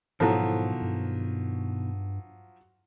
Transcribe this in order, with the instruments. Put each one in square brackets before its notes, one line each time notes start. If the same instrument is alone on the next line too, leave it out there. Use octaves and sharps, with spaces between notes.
[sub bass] G#2 [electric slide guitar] B2 D#3 [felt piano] F3 F#3 [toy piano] E4 A4 C5
[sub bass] G2